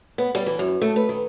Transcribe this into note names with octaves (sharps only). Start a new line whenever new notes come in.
B3
G3
E3
F#2
A3
B4
D#3